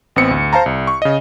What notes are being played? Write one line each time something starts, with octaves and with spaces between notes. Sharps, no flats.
A1 B3 C4 C#7
D2
C5 F5 A5 A#5
C2
C#6
C#3 D#5